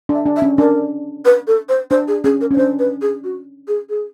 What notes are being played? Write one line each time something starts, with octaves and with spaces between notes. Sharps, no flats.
D4
E5
D4
E5
C#4
D4 A#4
B4
A4
C5
D4 C5
G#4
C#4 G#4
A#4
C#4
C#5
D4 C5
B4
G#4
F#4
G#4
G#4